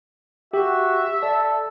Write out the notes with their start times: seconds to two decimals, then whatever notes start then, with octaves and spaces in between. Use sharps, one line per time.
0.53 F#4 G4 E5
1.23 A4 D5